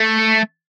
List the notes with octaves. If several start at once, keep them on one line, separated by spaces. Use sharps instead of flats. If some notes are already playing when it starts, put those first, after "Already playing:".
Already playing: A3